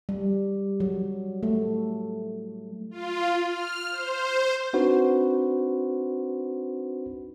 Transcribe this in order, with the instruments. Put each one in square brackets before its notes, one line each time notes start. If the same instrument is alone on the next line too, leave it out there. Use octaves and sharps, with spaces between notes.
[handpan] G3
F#3
A3
[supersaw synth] F4
F6
C5
[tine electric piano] C4 D4 D#4 F#4 B4 C5